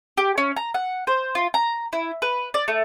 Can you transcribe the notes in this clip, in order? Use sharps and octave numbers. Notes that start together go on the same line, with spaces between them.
G4
C#4
A#5
F#5
C5
F4
A#5
E4
B4
D5
A3